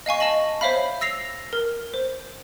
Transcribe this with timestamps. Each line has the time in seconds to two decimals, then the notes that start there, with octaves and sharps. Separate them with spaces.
0.06 D#5 F5 G#5 C#6
0.20 D#5 A5 A#6 F#7
0.61 C5 C#5 E5 F5 B5
1.01 E6 A#6 C7 F7
1.53 A#4
1.94 C5